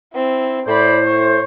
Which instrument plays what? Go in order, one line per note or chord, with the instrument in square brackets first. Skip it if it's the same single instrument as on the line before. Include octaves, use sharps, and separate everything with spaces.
[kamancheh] C4 E4
[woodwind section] A2 C5 [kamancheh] D5 B5
[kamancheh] C#5